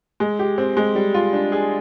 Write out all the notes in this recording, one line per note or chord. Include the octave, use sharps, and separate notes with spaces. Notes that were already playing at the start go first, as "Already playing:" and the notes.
G#3
G4
C4
G#3
G3
F4
D4
G#4